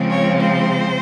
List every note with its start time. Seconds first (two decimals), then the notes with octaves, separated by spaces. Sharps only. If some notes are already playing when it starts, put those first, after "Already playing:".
Already playing: C#3 F3 G#3 C4
0.10 C#5
0.41 C5